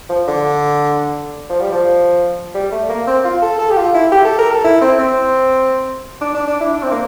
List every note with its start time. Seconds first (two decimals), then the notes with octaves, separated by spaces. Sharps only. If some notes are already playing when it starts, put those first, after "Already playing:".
0.10 F3
0.28 D3
1.50 F3
1.60 G3
1.72 F3
2.55 G3
2.72 A3
2.89 A#3
3.07 C4
3.24 F4
3.42 A4
3.59 A4
3.71 G4
3.77 F4
3.94 E4
4.12 G4
4.25 A4
4.39 A#4
4.51 A4
4.64 E4
4.81 C4
4.99 C4
6.21 D4
6.34 D4
6.47 D4
6.61 E4
6.74 D4
6.83 C4
6.91 A#3